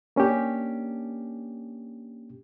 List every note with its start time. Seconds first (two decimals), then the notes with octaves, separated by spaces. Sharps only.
0.16 A#3 C#4 D4 G4